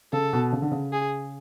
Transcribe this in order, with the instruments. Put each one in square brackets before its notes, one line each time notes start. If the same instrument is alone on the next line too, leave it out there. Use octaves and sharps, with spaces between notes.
[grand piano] C#3 [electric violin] A4
[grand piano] B2
C#3
D3
C#3
[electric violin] G#4